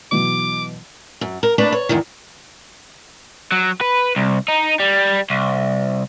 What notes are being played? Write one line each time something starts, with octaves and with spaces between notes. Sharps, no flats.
B2 E3 F#3 D6
F#2
A#4
A3 A#3 D4 B4 D5
C#5
E2 G#2 D#3
F#3
B4
C2
D#4
G3
C2